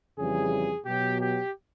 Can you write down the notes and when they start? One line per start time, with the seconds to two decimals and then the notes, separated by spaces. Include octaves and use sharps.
0.19 F2 C#3 E3 G3 G#4
0.86 B2 F#3 G4
1.20 G4